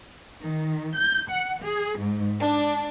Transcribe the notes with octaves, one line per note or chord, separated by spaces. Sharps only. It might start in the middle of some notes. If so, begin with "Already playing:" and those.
D#3
G6
F#5
G#4
G#2
D4